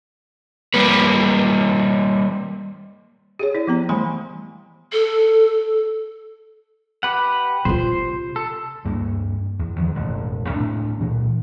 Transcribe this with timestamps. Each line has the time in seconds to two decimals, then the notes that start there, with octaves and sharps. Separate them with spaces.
0.74 G3 A#3 B4
3.39 G4 G#4 C#5
3.55 E4 D5
3.67 F3 B3 A#5
3.89 E3 G3 A3 G#5 B5 C6
4.93 A4
7.03 G4 B4 F#5
7.65 C3 F4 C5
8.36 A4
8.85 D2 G2 G3 A#3
9.59 E2
9.76 E2 D#3 F3 F#3
9.94 E1 A1 F#2
10.49 A2 C3 C#4 D4
11.00 A#2 E3 F#3